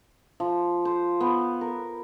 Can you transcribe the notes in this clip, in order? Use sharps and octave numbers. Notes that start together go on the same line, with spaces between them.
F3
C5
B3
A#4